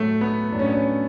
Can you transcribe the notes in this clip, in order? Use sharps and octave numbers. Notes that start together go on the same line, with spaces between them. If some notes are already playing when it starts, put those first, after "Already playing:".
Already playing: A2 F#3 A3
B3
A2 F#3 D4
C#4
B3
C#4